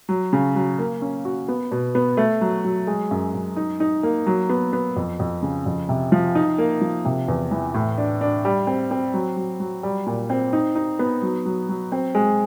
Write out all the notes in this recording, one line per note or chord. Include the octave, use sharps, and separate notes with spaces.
F#3
C#3
F#3
A#3
C#4
F#4
B3
B2
B3
A3
F#3
F#3
G#3
F#2
F#2
D#4
D#4
A#3
F#3
B3
B3
F2
F2
C#3
F2
C3
F3
D#4
A#3
F3
C3
E2
E3
A2
D4
D4
G3
C4
C4
F#3
F#3
F#3
G3
A#2
C4
D#4
D#4
B3
F#3
F#3
F#3
C4
G#3